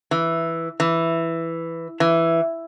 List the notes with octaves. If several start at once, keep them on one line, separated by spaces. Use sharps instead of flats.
E3
E3
E3